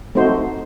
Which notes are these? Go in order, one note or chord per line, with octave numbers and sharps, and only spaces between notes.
A3 C4 D#4 F#4 C5